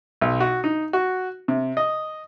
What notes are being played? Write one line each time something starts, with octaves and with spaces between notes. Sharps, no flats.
B1
F#4
D#4
F#4
C3
D#5